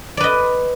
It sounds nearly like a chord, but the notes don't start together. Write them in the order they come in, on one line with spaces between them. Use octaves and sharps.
D5 B4 D#5